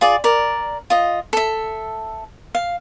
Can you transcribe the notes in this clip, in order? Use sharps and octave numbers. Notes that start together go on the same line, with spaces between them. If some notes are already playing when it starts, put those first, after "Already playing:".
F4 G#4 D5
A#4 D5
F4 D#5
A4 E5
F5